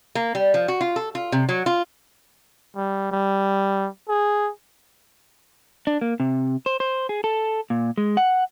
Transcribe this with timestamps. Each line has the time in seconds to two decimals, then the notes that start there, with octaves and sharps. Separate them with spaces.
0.15 A#3
0.35 G3
0.54 F3
0.68 F#4
0.81 F4
0.96 A4
1.15 F4
1.32 C3
1.49 F#3
1.66 F4
2.76 G3
3.12 G3
4.08 G#4
5.87 D4
6.01 A#3
6.20 C3
6.66 C5
6.80 C5
7.09 G#4
7.24 A4
7.70 A#2
7.98 G#3
8.17 F#5